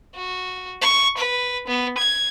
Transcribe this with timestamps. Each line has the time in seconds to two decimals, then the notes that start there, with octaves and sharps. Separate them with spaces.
0.15 F#4
0.82 C#6
1.18 B4
1.68 B3
1.98 G#6